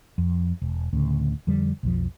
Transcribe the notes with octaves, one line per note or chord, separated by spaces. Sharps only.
F2
E1
D2 A2 C#3
F2 D3 G3
B1 F2 F3